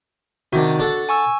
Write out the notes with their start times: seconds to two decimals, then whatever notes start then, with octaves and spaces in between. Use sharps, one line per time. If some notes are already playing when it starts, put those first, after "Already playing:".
0.53 C3 D#3 D4 F#4
0.79 D4 A4 F#5
1.09 G#5 C#6 E6